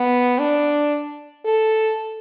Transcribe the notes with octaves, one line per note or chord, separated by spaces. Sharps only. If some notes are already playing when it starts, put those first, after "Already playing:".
Already playing: B3
D4
A4